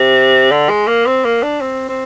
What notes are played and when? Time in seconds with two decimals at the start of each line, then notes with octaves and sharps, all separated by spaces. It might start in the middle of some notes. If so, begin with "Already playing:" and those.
Already playing: C3
0.51 D3
0.69 G#3
0.87 A#3
1.06 C4
1.24 A#3
1.43 D4
1.61 C4
1.88 C4